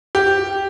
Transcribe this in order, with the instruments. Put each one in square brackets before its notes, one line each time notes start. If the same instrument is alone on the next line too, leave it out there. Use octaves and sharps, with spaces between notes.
[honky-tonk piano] G4